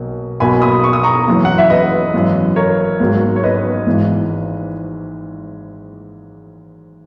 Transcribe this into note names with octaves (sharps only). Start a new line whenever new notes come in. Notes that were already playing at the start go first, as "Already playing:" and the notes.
Already playing: B1 B2 A#3
B1 B2 A#3 G#5 B5
B5 D#6
C#6
D#6
A#5 C#6
F#1 F#2 E3
F#5
E5
B4 D#5
G#1 F#2 E3
A#4 C#5
G#1 G#2 F#3 A#3
C#5
B4 D#5
G#1 G#2 E3